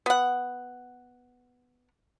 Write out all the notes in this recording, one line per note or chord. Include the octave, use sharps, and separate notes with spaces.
B3 F#5